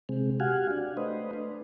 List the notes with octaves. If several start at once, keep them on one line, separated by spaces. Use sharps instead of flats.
C3 G#3 C4
F#4 G4 F5 F#5 G#5
D4
A3 B4 C5 D#5
D4